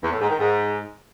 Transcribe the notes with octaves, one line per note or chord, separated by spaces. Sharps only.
E2
A2
G#2
D#3
G#2